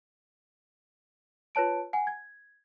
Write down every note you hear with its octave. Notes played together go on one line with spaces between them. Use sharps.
F4 B4 C#5 A5 D7
F#5 G#5
G#6